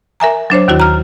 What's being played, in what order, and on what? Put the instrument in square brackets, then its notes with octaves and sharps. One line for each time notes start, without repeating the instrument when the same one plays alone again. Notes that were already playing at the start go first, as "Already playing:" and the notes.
[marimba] A#4 E5 G#5 A#5
F#3 D4 C5 C#5
D#2 D#3 E4 F#4
A#5 F6